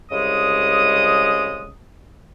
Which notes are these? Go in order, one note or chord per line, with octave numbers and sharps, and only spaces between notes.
C2 C#3 G#3 D#5 D#6